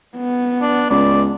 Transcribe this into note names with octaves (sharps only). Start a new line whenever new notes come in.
B3
D4
C#2 D5